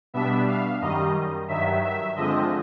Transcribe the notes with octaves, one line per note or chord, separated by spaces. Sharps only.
B2 G3 B3 D4 E5
F5
F#2 D#3 G3 D#5
G2 D#3 F#3 E5
E5
D3 F3 G#3 C4 D#5